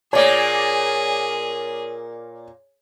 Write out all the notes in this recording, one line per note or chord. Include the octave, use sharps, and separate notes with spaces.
A#2 A#3 G#4 C#5 D5